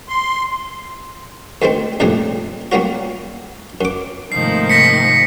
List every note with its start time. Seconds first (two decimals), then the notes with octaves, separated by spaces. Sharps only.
0.09 C6
1.62 D2 D#3 G#3 C4
2.00 A#1 F2 A2 C3 G3 G#4
2.72 F#3 G3 A#3 C#4 F#4
3.81 F#2 D6
4.32 G#2 C3 D#3 F3 A3 A#3 C7
4.70 A#6 B6 C#7